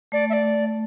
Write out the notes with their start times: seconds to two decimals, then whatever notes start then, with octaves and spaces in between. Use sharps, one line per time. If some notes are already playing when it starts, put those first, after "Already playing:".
0.12 A3 D5
0.30 E5
0.33 D5